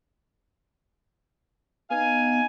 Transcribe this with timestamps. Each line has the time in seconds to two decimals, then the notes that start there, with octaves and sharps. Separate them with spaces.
1.91 B3 D#4 F5 G#5